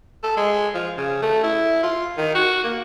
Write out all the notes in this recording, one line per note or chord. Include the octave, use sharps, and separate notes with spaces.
A4
G#3
F3
C#3
A3
E4
F4
D#3
F#4
A#3